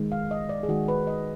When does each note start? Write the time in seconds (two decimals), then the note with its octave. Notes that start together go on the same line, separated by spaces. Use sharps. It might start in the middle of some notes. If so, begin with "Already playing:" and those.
Already playing: D#3 G#3
0.12 F5
0.31 D#5
0.49 D5
0.63 G#4
0.68 D#3 G#3 F#4
0.88 B4
1.07 D#5